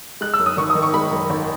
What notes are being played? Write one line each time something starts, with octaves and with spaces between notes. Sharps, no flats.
G#3 F#6
E6
F#2
D#6
G#1 C#6
D#6
D#3
C#6
G#3 B5
F#2
G#1